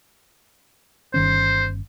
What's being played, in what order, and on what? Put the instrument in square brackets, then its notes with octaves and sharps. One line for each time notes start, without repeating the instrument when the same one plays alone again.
[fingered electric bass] G1 D#3 C#4 [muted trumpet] C5